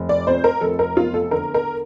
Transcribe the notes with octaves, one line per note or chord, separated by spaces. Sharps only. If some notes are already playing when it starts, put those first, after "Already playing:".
Already playing: F1
D5
F2 C5
A#4
F1 A4
A#4
E2 F4
A4
D3 A#4
A#4